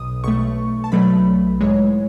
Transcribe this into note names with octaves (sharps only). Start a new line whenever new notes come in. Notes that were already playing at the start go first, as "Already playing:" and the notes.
Already playing: B1 B2 D#6
B1 B2 A3 C#6
A5
B1 B2 F#3 A3 B5
G#2 E3 G#3 C#5